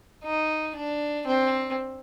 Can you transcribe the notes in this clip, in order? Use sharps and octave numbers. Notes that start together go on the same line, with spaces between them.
D#4
D4
C4